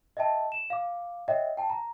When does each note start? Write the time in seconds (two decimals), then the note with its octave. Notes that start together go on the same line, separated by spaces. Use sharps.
0.17 D#5 E5 G5 A5
0.52 E7
0.70 F5 D6
1.28 C#5 D#5 E5 F#5 G5
1.57 G5 A5
1.70 A#5